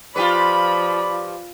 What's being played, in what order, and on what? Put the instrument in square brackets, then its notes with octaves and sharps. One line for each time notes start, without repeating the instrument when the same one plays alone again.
[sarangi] F3 [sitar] F4 G4 B4 [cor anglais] D5 [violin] B5